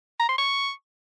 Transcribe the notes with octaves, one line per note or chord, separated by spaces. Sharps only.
A#5
C6
C#6